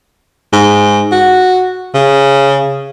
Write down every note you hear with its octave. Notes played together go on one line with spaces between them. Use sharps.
G#2
F#4
C#3